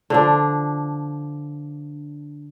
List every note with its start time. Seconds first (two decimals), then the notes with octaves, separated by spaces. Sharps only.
0.10 D3 F3 D4